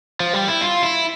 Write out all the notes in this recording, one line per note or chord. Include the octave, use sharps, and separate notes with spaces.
F3
G3
E4
F4
E4